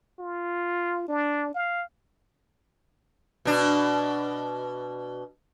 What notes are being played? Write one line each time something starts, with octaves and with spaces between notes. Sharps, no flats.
F4
D4
F5
B2 D4